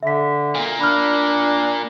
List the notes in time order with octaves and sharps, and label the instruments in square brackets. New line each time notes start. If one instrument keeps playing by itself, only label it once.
[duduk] D3 [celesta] E5 B6
[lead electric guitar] A#2 A#3
[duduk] D4 [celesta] B5 F6